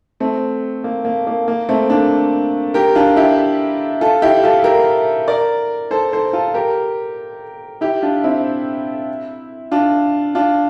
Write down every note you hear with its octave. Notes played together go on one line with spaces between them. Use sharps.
A3 C4
A#3
A#3
A#3
A#3
A3 C4
A#3 D4
G4 A#4
D4 F4
E4 G4
F4 A4
E4 G4
F4 A4
G4 A#4
A#4 D5
A4 C5
A4 C5
F4 A4
G4 A#4
E4 G4
D4 F4
C4 E4
D4 F4
D4 F4